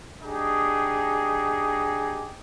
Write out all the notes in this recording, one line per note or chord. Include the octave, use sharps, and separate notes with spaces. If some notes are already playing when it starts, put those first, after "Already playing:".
D4 D#4 G4 G#4